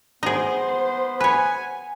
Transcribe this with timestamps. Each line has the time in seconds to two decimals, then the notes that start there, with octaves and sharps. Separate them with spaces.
0.23 B3 D#4 G#4 C5
1.20 B4 C#5 G#5